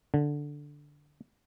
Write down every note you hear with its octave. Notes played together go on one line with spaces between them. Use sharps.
D3